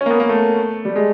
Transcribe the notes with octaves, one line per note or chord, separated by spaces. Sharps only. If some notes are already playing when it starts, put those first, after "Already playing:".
C#4
A#3
B3
A#3
A3
G3
G#3